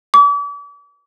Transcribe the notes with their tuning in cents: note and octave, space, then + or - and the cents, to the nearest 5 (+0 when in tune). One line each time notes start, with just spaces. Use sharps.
D6 -40